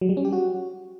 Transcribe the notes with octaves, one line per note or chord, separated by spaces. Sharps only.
F#3
G3
C#4
G4
F#4